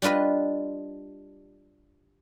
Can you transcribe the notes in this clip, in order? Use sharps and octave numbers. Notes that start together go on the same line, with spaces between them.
G3 D4 F4 B4 D#5